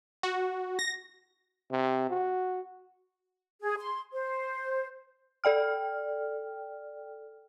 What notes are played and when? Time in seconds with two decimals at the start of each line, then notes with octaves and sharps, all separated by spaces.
0.23 F#4
0.79 A#6
1.72 C3
2.10 F#4
3.62 G#4
3.78 C6
4.12 C5
5.44 A4 D5 G5 F6